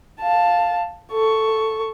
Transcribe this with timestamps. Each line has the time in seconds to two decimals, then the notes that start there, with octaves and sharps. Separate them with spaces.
0.21 F5 A5
1.12 A4 C#6